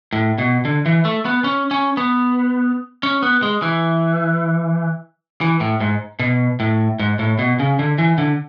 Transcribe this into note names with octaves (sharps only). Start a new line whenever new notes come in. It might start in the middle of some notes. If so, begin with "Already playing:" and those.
A2
B2
D3
E3
A3
B3
C#4
C#4
B3
C#4
B3
G#3
E3
E3
A2
G#2
B2
A2
G#2
A2
B2
C#3
D3
E3
D3